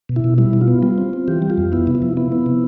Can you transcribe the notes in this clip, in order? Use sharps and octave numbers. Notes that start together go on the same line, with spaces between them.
B2
E4
B2
G3 E4
B2
F4
B3
G3 F4
C4
C4
E3 G4
G3
F4
F2
B3 E4
C3
E4
F3
B3 E4
B3
C3